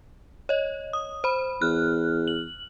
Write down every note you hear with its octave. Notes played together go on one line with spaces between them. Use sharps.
C#5 D#5
D#6
C5 B5
E2 F6 F#6
F#7